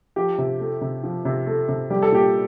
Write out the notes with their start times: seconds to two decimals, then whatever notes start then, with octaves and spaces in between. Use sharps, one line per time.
0.16 F3 G4
0.38 C3
0.60 A3
0.81 C3
1.03 F3
1.25 C3
1.47 A3
1.69 C3
1.90 G3 G4
2.03 A4
2.12 A#2 G4